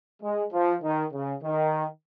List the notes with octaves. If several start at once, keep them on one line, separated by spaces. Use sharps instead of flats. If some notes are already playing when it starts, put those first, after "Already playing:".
G#3
F3
D#3
C#3
D#3